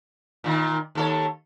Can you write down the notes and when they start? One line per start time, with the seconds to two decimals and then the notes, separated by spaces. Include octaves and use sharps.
0.44 A#2 D#3
0.95 D#2 A4 C#5